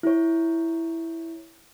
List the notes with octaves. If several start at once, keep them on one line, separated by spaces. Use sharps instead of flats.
E4 C#5